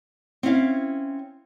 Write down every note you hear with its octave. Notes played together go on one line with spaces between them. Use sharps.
C4 C#4 E4 F5